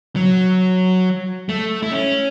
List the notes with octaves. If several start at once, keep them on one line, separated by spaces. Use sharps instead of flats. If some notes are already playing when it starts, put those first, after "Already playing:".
F#3
A3
E4
C#4